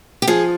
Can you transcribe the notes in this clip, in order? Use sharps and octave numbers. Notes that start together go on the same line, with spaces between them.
G4
F3 G#4